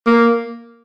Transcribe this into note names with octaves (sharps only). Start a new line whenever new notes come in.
A#3